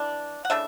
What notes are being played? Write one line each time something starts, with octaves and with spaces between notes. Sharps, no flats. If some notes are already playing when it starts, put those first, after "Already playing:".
Already playing: E3 D4 D5
F#5
C#3 E3 A3 D4 E5